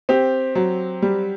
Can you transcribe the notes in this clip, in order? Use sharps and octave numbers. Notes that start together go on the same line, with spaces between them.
C4 G4
F#3
G3